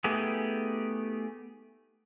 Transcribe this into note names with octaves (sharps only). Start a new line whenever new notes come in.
A3 B3 D#4 G4 G#4